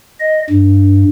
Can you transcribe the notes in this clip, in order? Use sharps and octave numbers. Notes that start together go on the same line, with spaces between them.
D#5
G2